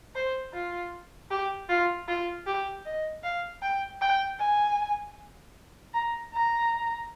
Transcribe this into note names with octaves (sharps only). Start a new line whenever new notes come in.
C5
F4
G4
F4
F4
G4
D#5
F5
G5
G5
G#5
A#5
A#5